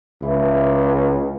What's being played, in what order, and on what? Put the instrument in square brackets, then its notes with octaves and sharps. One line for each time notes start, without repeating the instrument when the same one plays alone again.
[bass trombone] C#2 [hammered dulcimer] E3